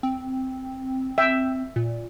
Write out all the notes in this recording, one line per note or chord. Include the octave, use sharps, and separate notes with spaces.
C4
E5 G5
A#2